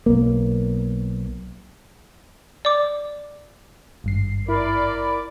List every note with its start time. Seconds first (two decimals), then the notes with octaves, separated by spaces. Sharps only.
0.06 B1 A#3
2.65 D5 D6
4.04 G#1 G2 C7
4.48 E4 A#4 D5 B5